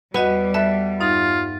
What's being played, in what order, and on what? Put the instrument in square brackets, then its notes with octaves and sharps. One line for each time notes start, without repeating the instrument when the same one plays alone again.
[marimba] E2 F#4 D#5 [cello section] G3 [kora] B3
[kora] A4 B4 [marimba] E5
[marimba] G2 D#4 F5 [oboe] F4